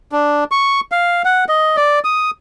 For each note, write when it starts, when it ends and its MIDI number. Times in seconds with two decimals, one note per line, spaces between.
0.12 0.44 62
0.51 0.80 85
0.92 1.22 77
1.25 1.44 78
1.48 1.77 75
1.77 1.99 74
2.04 2.31 87